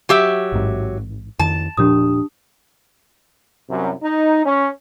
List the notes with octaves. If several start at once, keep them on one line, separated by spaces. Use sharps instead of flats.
F#3 G4 E5
A1 G#2
F2 D#3 A5
E1 A#2 F3 D4 G4 D#6
C2 F#2
D#4
C#4